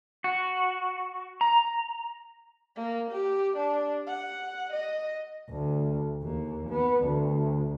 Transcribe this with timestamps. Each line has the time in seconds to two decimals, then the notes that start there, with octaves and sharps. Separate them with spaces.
0.24 F#4
1.41 A#5
2.76 A#3
3.11 G4
3.57 D4
4.07 F#5
4.72 D#5
5.50 D2
6.22 D#2
6.70 B3
7.04 D2